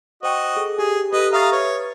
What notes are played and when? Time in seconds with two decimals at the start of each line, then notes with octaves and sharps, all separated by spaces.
0.23 F#4 C5 D#5 G5 C#6
0.56 G#4 A4
0.78 G4 G#4
1.13 G4 A4 B4 D#5
1.33 E5 F5 A#5 C#6 D#6 A6
1.52 B4 C#5